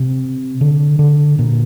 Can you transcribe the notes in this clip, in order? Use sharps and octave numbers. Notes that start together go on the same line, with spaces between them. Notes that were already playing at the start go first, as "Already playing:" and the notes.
Already playing: C3
D3
D3
A#2